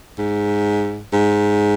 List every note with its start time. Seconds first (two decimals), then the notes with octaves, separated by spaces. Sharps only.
0.19 G#2
1.13 G#2